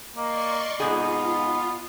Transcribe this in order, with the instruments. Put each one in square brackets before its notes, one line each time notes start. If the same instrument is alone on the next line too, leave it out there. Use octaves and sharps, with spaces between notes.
[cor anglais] A#3 [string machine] D5 C6 C#6 [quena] D#5
[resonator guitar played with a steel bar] G#2 C3 G#4 [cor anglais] B3 [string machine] F4